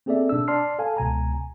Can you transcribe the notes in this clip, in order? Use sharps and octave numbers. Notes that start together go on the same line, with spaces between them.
A#3 C4 G#4 A4 D5 E5
B2 D4 E6
D5 A5 C6 F6 C7
A4 F5 G#5 A5
C#2 B2 G#5 A#5